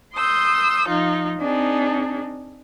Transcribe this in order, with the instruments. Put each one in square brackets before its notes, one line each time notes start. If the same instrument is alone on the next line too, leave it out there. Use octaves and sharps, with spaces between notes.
[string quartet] C6 D#6 E6 G6
F3 D#4 F4
C4 D4 D#4 G#4